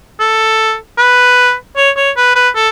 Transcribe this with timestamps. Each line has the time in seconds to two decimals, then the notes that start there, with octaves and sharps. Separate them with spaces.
0.20 A4
0.98 B4
1.76 C#5
1.97 C#5
2.17 B4
2.35 B4
2.55 A4